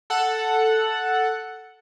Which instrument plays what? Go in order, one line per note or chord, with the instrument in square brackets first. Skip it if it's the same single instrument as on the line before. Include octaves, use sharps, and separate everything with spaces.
[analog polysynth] A4 F#5